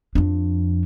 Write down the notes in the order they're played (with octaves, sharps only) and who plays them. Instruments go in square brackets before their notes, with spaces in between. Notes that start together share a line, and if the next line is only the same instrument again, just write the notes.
[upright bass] F2 D4